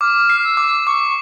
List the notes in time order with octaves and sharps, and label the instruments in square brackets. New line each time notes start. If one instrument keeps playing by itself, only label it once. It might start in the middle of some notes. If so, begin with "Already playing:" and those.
[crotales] D6 [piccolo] F6
[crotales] C7
[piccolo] E6
[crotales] D6
[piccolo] C#6 [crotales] D6